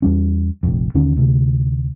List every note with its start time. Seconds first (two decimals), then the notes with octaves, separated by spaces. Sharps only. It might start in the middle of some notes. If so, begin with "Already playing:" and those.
0.02 E2 G3 C#4
0.63 F1 A#1 F2
0.94 D#2 D3 D#3 C#4
1.16 D2 C3